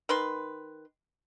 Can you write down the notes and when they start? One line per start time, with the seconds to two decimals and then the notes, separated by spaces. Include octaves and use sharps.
0.09 D#3 B4 C6